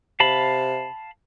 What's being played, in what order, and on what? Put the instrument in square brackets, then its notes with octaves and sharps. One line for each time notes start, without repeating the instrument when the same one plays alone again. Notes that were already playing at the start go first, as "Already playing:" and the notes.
[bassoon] C3 [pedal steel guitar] F5 A5 B5